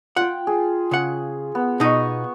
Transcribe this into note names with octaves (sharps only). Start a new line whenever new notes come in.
F4 F#5 G5
G#4
C#3 F#5
B3
B2 D#4 C#6 D#6